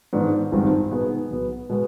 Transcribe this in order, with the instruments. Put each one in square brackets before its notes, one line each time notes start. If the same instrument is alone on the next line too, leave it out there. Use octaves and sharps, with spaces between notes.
[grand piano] G#2 D#3 B3 D4
G#1 G2 D#3 G#3 C4
B2 B3 D#4 G#4
B1 B2 B3
B2 G#3 B3